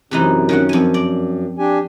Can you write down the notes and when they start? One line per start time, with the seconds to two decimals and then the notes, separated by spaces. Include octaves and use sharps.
0.11 F#2 C3 E3 D#4
0.49 D#3 C#4 F#5
0.69 F2 G#5
0.94 D5
1.58 D4 G4 G#5